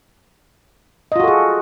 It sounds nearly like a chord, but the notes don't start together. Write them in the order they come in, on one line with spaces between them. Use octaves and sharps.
D#5 F4 F#4 A4 G#4